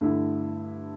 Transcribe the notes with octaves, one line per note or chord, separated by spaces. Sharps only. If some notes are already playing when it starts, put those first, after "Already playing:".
G2 D3 A3 E4